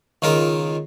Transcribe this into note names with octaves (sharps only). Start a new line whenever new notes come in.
C#2 D#3 F4 A#4